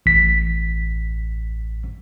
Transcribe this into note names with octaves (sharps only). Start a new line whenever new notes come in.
A1 B6